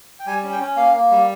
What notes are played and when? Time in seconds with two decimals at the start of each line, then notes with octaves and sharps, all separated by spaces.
0.20 G5
0.26 G3 G#5
0.43 C#4
0.52 G5
0.60 C#4
0.76 A#3 F5
0.94 A#3
1.11 G3